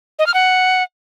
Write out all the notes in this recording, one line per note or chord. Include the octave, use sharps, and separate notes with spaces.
D#5
F6
F#5